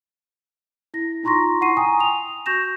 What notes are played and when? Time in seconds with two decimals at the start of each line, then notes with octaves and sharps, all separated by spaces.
0.94 E4 A#6
1.23 D#4 F4 A#5 C6 C#6 A#6
1.61 E4 F#5 C6 C#6 C7 D#7
1.77 G5 G#5 A#5 C#6 D#6
2.00 F7
2.46 F#4 C#6 G6 A#6 E7